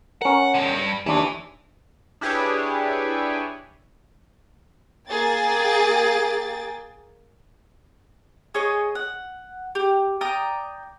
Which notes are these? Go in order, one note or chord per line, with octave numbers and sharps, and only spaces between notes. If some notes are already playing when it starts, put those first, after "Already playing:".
C#4 A#4 F#5
D3 G#3
G2
D#2 E3 D4
D4 E4 G4 G#4 B4 C#5
A#3 G#4 G5 A6
G#4 C#5 D#5 D#6
F#5
G4
D5 G5 A#5 D#6